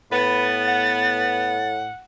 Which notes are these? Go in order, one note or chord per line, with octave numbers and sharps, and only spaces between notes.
A2 B3 B4 A6
F#5